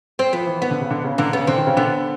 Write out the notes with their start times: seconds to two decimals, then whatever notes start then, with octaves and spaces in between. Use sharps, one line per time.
0.19 C4
0.33 F3 B3
0.47 E3
0.61 D#3 B3
0.71 D3
0.81 C#3
0.91 D3
1.04 C#3
1.18 D3 A#3
1.33 C#3 B3
1.47 D3 C4
1.58 D#3
1.67 C#3
1.77 D3 B3